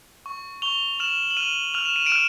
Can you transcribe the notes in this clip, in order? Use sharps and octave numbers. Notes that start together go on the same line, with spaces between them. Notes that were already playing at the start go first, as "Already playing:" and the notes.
C#6
C#6 F7 G7
F6 E7 F#7
F#7
F6 D#7 F7
F6 F7
E7
D#7
D7 E7
F6